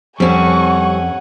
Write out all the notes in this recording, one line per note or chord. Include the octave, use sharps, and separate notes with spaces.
F2 G3 C4 C#4 F#5 G#5 C#6